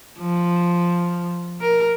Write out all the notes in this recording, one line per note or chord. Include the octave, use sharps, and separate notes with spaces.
F3
A#4